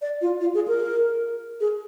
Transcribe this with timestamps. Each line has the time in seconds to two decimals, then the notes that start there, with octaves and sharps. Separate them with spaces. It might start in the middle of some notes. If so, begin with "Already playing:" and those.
0.02 D5
0.22 F4
0.40 F4
0.54 G#4
0.68 A#4
1.61 G#4